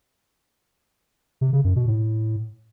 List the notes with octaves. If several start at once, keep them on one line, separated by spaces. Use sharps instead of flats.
C3
C#3
F#2
B2
A2